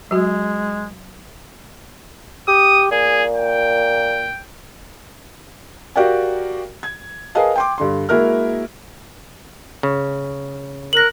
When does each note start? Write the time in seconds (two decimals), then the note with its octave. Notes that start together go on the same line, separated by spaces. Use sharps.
0.11 F#3 G#3 F#4
2.48 G4 D#6
2.91 A#2 G#4
3.36 G5
5.96 F#4 G4 A#4 D5 F5 G5
6.83 G#6
7.35 G#4 A#4 B4 D#5 F5 A5
7.56 G5 C6 D6
7.78 G2 D3 C6
8.09 G#3 A#3 E4 F#4 A#4 F6
9.83 C#3
10.93 A#4 F#6 A#6 F#7